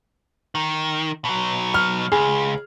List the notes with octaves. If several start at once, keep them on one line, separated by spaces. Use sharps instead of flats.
D#3
B2 F#3
F6
C#2 G#4